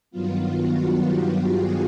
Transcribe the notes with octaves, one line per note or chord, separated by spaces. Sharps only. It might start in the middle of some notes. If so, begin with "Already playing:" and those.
G2 D#3 F#3 B3 F4
F#4
F4 G4
F#4 G#4